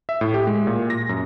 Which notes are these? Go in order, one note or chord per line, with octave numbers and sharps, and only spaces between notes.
E5
A2
G4
G#3
A#2
A#6
F#2